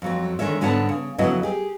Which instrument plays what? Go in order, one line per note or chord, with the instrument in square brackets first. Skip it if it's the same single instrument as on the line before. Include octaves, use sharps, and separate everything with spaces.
[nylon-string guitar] F2 F#3 C4
D3 D#3 G#3 C#5 E5
G#2 D3 B3 C#5 F#5 A5
C#3
F2 C#3 F#3 B3 E4 D#5
G4 G#4